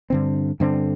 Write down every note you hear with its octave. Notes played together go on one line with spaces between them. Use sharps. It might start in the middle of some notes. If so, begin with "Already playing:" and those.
G2 D3 C4
G2 D3 C4